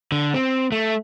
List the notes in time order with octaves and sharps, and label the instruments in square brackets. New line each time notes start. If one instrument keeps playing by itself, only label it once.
[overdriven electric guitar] D3
C4
A3